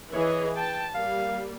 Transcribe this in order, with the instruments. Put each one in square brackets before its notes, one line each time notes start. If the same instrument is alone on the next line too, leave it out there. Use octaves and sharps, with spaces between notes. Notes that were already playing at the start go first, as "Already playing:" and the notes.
[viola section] E3 G#4 D#5 [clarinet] C#5
[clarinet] G5 [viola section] A5
[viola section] G3 A#3 [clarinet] F5